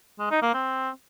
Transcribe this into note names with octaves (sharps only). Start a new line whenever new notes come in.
G#3
D#4
A#3
C4